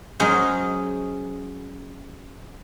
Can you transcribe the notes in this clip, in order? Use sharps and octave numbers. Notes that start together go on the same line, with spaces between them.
F#3 G#3 C#4 G#4 C5